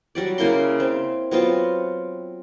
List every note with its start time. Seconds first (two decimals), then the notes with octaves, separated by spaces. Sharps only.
0.15 F#3 G3 D5
0.38 C#3 A#3 E4 C6
0.80 C4
1.31 F#3 B3 C4 F4